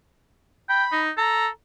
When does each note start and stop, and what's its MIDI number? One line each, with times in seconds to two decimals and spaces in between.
0.69 0.84 79
0.69 1.02 83
0.92 1.11 63
1.18 1.49 69
1.18 1.49 82